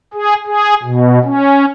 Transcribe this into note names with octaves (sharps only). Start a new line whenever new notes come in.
G#4
G#4
B2
C#4